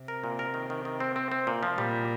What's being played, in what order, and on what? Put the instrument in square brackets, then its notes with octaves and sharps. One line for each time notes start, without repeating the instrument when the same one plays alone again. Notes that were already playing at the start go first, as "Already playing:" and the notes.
Already playing: [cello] C3
[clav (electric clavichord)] A#4
A#2
A#4
D#3
D#3
D#3
C4
C4
C4
A#2
F3
[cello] A#2 [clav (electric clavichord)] G3